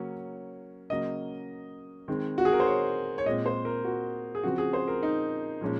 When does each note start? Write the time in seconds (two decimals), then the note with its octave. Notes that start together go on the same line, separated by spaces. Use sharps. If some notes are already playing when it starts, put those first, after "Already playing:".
Already playing: C#3 F#3 A#3 C#4
0.90 C#3 F#3 A#3 D#5
2.08 D#3 G#3 C4
2.38 F#4
2.45 G#4
2.53 A#4
2.60 C5
2.67 C#5
3.18 C#5
3.26 A#2 G#3 C4 D#5
3.46 C5
3.65 A#4
3.84 F#4
4.35 G#4
4.43 C#3 F3 C4 F#4
4.58 G#4
4.73 C5
4.88 A#4
5.03 D#4
5.61 A#2 F3 G#3 C#4